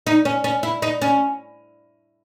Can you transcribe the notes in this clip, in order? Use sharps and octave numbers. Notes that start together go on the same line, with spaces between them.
D#4
C#4
C#4
E4
D#4
C#4